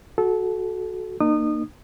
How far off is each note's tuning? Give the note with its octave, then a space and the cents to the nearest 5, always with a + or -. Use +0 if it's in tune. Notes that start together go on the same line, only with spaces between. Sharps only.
F#4 +0 A4 -25
A#3 +0 D#4 -35 D#6 -25